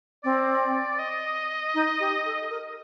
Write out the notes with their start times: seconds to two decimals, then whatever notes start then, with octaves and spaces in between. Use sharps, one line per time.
0.24 C4 D5
0.99 D#5
1.74 D#4
2.00 G4
2.26 A4
2.50 A#4